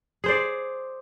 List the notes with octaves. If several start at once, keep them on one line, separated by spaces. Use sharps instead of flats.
G#4 C5 D5